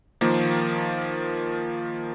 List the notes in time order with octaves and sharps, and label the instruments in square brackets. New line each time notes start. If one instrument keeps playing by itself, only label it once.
[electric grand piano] D#3 F3 A#3